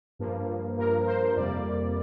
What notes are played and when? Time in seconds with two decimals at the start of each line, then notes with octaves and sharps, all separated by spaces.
0.19 G2 F3 A#3
0.78 G2 F3 A#3 A#4
1.02 A#4
1.07 C5
1.36 F2 C3 G3 A#3 D5